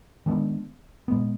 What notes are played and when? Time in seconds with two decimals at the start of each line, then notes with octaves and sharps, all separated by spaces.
0.26 D#3 G#3 B3 D4
1.08 A#2 G#3 B3